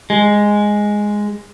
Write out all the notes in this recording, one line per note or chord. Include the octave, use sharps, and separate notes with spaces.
G#3